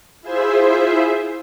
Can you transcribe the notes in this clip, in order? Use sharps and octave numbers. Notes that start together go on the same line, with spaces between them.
E4 F4 G#4 C5 E5